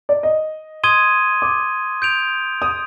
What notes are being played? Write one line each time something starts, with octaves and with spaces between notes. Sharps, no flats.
D5
D#5
C6 D#6 G#6 D#7 G7
D6
G6 D7 F7
D#6